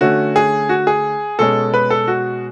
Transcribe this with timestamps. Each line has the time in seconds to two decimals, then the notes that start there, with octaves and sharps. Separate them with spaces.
0.01 D3 A3 C#4 F#4
0.36 G#4
0.69 F#4
0.87 G#4
1.39 B2 G#3 C#4 A4
1.74 B4
1.90 A4
2.08 F#4